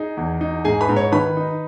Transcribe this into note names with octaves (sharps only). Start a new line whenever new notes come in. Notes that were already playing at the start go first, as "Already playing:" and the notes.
Already playing: D#4 G#4
E2
D#4
G#2 G#4 G#5
B4 B5
G#2
C#5 C#6
D#3 B4 B5
D#4